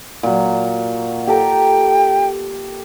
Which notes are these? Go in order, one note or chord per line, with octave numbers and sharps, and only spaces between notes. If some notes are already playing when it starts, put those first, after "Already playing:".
A#2 F#3
G4 A4 G5 A#5